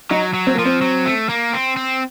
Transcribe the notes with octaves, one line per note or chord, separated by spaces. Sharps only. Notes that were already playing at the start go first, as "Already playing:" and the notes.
F#3 D#4
F#3
C4
F3 A#3
C4
F#3
A3
A#3
C4
C4